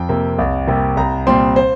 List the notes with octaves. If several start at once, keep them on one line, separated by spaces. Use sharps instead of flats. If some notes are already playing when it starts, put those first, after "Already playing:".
Already playing: F2 G5
C3 A#3
C2
C3 G3 A#3
C2 A#5
A#2 G3 C4 C6
C5